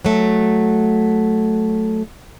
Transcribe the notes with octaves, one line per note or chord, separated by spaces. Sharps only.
F#3 A3